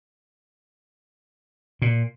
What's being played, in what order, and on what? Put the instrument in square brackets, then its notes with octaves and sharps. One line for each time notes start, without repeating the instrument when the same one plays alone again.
[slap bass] A#2